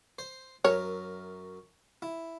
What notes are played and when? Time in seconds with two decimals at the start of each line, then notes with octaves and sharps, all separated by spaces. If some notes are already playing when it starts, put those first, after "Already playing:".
0.19 C5
0.65 F#2 A#4 C#5
2.02 E4